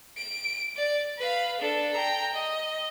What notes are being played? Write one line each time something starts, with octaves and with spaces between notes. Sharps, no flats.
D7
D5
B4 F5
D4 A4
G5 A#5
D#5